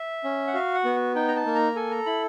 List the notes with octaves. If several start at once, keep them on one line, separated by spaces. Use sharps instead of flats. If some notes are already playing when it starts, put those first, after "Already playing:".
Already playing: E5
C#4
F#5
F#4 F5
F#5
B3
D#4 G5
A#5
A5
A#3
A#5
A4 G#5
A#5
E4 B5